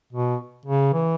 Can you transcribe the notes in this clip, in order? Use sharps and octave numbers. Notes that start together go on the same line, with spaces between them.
B2
C#3
E3